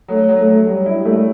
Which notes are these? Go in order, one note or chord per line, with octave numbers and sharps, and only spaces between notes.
F#3 A3
F#3
A3
F#3
F#3 G3
E4
G3
A3